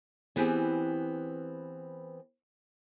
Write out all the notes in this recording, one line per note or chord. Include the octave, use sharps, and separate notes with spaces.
E3 B3 C4 G4 G#4